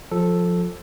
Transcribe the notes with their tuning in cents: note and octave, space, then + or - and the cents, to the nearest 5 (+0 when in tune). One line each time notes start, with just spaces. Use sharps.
F3 +20 A4 +0